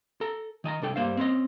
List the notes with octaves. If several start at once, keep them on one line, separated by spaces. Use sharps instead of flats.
A4 A#5
D#3 D#5 A5 A#5
C2 D4 A4 G5
G2 G3 A#3 C5 F5
C4 C#4 B4 D#5